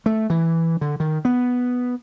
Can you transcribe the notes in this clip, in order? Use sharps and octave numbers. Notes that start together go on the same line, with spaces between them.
A3
E3
D3
D#3
B3